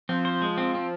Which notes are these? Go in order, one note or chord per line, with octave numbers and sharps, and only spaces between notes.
F3 C4
C5
G#3
C4
C4